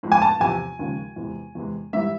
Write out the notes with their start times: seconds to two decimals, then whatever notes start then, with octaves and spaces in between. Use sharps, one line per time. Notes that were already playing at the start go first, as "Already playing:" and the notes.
0.03 A2 F3 G#3
0.12 G#5
0.22 A5
0.40 E2 C3 F3 G#5
0.79 D#2 C#3 F3 G#3
1.16 E2 C3 E3 G#3
1.55 E2 C3 E3 G#3
1.93 G#2 E3 G3 E5